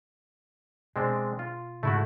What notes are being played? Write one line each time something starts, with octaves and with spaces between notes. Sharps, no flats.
B2 G#3 C4 D4
F4
G#2 C#3 A3 E4 F#4